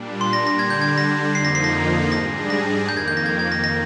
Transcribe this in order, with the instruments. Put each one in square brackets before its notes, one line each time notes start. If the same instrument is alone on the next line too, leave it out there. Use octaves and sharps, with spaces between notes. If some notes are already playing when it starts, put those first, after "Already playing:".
Already playing: [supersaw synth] A#2 G3 D4
[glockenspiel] C6
A#6
A#6
[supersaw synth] D3 G3 D4 [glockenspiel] G#6
[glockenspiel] G6
G#6
A#6
[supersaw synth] F2 D3 F3 A#3 D#4 [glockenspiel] C7
[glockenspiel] A#6
C7
A#6
[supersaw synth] G#2 G3 D4 G#4 [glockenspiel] A#6
[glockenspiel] A#6
[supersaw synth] F2 D#3 A#3 [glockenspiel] G6
[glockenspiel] G#6
G6
A#6
G#6
G#6
A#6
A#6